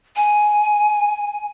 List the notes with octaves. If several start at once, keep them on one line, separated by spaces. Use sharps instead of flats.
G#5